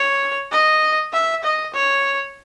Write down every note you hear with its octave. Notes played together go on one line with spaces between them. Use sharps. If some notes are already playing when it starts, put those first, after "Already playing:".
Already playing: C#5
D#5
E5
D#5
C#5